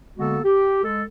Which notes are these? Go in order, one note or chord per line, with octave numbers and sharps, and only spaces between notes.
D3 G#3 A#3 B3 F#4 A4
G4
G#3 A4